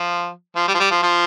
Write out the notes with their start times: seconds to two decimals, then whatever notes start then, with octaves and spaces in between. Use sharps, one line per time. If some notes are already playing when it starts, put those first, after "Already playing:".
Already playing: F3
0.56 F3
0.68 G3
0.74 F3
0.80 G3
0.91 F3
1.03 F3